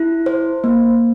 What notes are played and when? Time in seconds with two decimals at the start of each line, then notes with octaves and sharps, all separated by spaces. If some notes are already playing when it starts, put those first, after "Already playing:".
Already playing: E4
0.26 C5
0.64 A#3